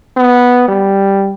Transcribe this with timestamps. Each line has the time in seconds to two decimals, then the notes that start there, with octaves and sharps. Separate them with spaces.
0.17 B3
0.68 G3